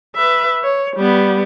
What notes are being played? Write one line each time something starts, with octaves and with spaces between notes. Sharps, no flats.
B4 E5
C#5
G3 B3